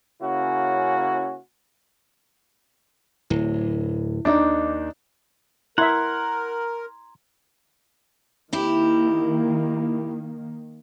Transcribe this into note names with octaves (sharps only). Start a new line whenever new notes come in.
C#3 A#3 C#4 E4 F#4
D1 E4
D#2 D4 D#4 D#5 D6
E4 A#4 E5 F#5 A#5 C6 G#6
D#3 A#3 C4 E4 G4